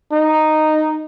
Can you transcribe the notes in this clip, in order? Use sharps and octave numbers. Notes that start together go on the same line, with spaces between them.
D#4